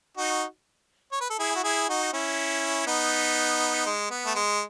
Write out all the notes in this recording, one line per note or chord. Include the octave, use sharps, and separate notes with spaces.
D#4 F#4
C#5
B4
A4
E4 G#4
F#4
E4 G#4
D#4 F#4
C#4 E4
B3 D#4
G#3
B3
A3
G#3